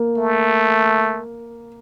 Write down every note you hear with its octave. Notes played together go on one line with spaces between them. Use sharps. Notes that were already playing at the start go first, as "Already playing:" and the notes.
Already playing: A#3
A3